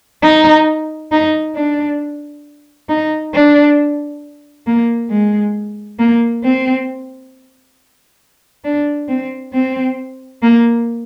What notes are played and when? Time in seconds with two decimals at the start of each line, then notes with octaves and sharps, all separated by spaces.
0.23 D#4
1.12 D#4
1.56 D4
2.89 D#4
3.34 D4
4.67 A#3
5.10 G#3
5.99 A#3
6.44 C4
8.64 D4
9.09 C4
9.54 C4
10.42 A#3